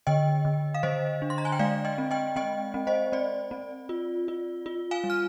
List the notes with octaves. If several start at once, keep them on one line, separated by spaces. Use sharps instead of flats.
D3 D#5 G5
D3
F5
D3 C5 D#5
D4
C6
A#5
G#5
G5
G#3 D5 F5
D#5 G5
C4
D#5 G5
C4 D#5 G5
C4
C5 D#5
C4 D5
C4
F4
F4
F4
F5 G#5
G3
F6